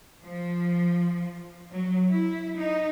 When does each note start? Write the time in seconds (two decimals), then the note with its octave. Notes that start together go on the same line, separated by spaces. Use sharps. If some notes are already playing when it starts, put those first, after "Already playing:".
0.24 F3
1.72 F#3
2.10 E4
2.57 D#4